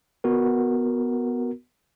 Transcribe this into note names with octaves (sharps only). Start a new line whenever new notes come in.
B3 F#4 A#4